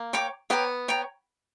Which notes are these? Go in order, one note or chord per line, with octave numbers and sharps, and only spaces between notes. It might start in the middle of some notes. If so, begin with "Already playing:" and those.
Already playing: A#3
C#5 G5 A#5 D6
B3 C#5 G5 A#5 D6
C#5 G5 A#5